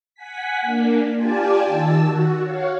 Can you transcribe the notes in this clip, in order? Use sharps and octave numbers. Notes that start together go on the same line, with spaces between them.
F#5 G#5 B6
A#3 D4
F4 G4 D5 G#5 A5
D#3 A5 E6
F#4
C#5 F5 F#5